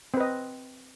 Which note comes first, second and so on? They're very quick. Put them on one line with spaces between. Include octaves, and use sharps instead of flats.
C4 B4 D#5